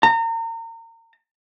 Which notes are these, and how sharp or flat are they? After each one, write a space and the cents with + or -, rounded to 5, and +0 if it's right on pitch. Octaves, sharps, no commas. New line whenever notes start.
A#5 -35